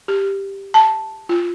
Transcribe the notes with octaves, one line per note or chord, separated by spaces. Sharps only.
G4
A5
F4